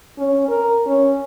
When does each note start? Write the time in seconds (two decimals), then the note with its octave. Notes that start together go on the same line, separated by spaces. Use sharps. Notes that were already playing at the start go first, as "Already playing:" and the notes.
0.18 C#4
0.49 A#4
0.86 C#4